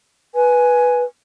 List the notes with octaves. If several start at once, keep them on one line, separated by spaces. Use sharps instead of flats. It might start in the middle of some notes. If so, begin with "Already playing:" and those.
B4 G#5